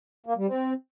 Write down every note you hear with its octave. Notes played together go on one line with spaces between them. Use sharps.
A#3
G3
C4